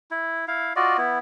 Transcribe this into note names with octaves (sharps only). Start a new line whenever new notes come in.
E4
E4 F5
F4 F#4 D5 D#5
B3 E4